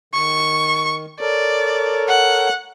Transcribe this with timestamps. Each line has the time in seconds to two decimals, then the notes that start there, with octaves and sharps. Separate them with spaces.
0.14 D#3 C#6
1.20 A4 A#4 C#5 D5
2.08 F#5